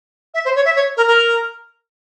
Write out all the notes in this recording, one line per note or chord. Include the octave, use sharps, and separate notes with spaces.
E5
C5
C#5
E5
C#5
A#4
A#4